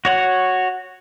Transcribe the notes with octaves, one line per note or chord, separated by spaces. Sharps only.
F#4 C#5 F#5